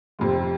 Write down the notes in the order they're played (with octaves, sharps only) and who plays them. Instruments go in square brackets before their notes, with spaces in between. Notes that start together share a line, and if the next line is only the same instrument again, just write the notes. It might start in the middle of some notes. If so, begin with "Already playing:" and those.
[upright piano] F1 F2 C3